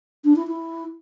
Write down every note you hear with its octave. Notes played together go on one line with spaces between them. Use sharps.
D4
E4
E4